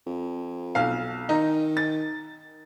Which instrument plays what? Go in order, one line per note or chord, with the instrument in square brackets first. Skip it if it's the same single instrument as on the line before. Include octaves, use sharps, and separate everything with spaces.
[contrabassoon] F2
[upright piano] B1 F5
[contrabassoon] D#3 [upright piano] D#4
[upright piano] A6